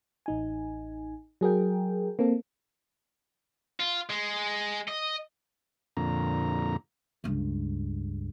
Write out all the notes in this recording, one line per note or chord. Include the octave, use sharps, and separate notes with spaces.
A1 D#4 G#5
F#3 G#4 A#4 G5
A#3 C4 A4
F4
G#3
D#5
F2 A#2 D3 A#5
C#2 G2